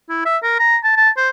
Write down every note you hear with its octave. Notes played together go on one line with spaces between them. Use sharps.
E4
E5
A#4
A#5
A5
A5
C5